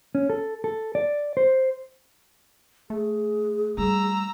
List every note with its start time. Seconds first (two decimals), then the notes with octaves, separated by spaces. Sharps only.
0.15 C#4
0.30 A4
0.64 A4
0.95 D5
1.37 C5
2.90 A3 G#4
3.78 G3 A#5 E6